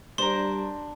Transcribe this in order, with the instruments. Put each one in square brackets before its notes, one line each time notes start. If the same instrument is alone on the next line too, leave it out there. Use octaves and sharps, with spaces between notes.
[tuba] G3 [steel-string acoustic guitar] D4 [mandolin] A#4 C5 [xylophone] C6